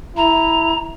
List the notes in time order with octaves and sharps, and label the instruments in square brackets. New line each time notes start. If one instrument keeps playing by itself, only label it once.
[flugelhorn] E4 [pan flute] A#5